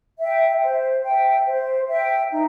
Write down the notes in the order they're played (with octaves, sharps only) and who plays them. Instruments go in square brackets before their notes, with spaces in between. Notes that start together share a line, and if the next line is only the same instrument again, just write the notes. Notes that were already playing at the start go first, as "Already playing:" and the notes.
[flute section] E5 G5
C5
E5 G5
C5
E5 G5
D#4